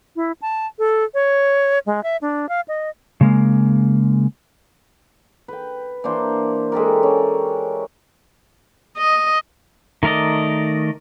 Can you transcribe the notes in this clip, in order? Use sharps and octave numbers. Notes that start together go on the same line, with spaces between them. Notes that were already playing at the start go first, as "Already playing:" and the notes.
E4
A5
A4
C#5
G#3
E5
D4
F5
D#5
C#3 G#3 A#3
B4 G5
E3 A#3 D4 C5
G#3 G4 A4 A#4
C#4
D#5
D#3 A3 A#4 D5 D#5